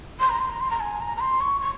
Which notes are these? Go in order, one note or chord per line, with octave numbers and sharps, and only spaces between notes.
C6
A#5
C6
A#5
C6
A#5
G#5
A#5
A#5
C6
C#6
C#6